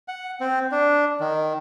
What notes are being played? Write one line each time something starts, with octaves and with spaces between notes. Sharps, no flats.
F#5
C4
D4
D#3